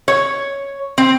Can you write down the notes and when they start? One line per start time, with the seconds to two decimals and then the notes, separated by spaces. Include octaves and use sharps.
0.08 C#5
0.98 C4